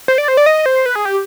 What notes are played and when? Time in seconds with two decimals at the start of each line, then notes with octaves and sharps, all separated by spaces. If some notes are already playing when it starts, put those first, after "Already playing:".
0.08 C5
0.18 D5
0.28 C5
0.37 D5
0.46 D#5
0.66 C5
0.86 B4
0.95 G#4
1.05 G4